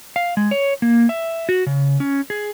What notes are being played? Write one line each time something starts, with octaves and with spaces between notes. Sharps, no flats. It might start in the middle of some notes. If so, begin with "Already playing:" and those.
F5
G#3
C#5
A#3
E5
F#4
C#3
C#4
G#4